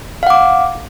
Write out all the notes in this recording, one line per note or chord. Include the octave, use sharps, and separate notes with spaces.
F5 F#5 D6